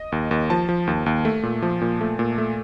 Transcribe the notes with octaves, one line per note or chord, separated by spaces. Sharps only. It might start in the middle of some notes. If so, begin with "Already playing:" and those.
Already playing: D#5
D#2
D#2
F3 A5
F3
D#2
D#2
A3
A#2
F3
A#2
A3
A#2
A3